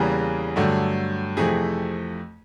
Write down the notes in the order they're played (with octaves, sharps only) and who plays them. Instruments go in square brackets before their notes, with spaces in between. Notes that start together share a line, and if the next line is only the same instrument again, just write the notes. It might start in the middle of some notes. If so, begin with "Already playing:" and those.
Already playing: [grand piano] E2 C#3 E3 G3 A#3 G#4
G2 D3 F#3 A3
F2 C3 E3 A3 G#4